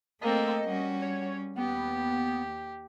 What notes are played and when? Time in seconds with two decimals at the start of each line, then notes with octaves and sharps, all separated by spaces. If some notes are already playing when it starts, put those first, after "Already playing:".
0.22 A3 A#3 C4 A4 D#5
0.67 G3 C#4 F#4
1.02 C#5
1.57 D#2 B3 G4